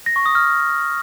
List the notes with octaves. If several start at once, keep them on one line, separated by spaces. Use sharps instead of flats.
A#6
C#6
D#6
F6